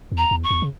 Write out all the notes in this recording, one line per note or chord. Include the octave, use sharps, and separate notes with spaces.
E2
A#5
E2
C#6
E2
C#3